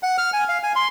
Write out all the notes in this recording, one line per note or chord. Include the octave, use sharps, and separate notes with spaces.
F#5
F6
G#5
F5
G#5
C6